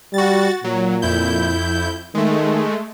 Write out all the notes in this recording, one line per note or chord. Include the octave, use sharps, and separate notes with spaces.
G3 F#4 A6
A#2 F#3
F2 E4 G6
D#3 G#3 A3